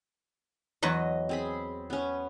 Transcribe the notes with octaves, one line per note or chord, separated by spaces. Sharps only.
E2 F#3 B4 D#5
C4 G#4 B5
B3 C#4